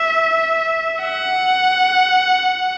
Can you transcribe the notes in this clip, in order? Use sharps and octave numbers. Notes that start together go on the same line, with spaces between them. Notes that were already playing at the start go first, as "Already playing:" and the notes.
Already playing: E5
F#5